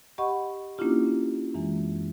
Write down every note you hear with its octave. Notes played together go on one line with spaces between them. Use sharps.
G4 D#5 F#5 B5 C#6
A#3 C#4 D4 E4 F4 G4
F#2 E3 G#3